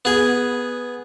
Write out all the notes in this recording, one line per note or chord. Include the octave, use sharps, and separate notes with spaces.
B3 G#4